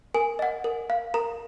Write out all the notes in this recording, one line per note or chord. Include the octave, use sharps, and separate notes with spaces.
A#4 G#5
D#5 F#5
A#4
F5
A#4 A#5